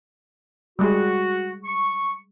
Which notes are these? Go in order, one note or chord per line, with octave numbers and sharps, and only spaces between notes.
G3 G#3 F#4 G#4
C#6